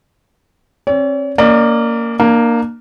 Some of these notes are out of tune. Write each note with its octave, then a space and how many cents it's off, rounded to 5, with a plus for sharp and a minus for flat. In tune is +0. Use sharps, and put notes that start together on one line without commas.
C4 +45 C#5 +45
A#3 -10 C#4 +35 D5 +35
A#3 +0 D4 +35